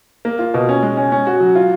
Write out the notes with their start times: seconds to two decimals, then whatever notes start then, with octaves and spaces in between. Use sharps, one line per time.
0.25 A#3
0.39 F4
0.54 B2
0.69 C#4
0.83 G#3
0.97 C#4
1.12 C#4
1.27 F#4
1.40 F#3
1.56 F4